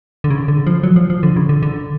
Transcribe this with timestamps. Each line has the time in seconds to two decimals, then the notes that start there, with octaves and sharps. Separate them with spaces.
0.24 D3
0.30 C#3
0.48 D3
0.67 F3
0.83 F#3
0.96 F3
1.10 F3
1.23 D3
1.36 C#3
1.49 D3
1.63 D3